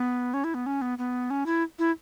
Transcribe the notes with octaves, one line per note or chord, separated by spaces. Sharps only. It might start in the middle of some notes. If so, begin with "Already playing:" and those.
Already playing: B3
C#4
E4
B3
C#4
B3
B3
C#4
E4
E4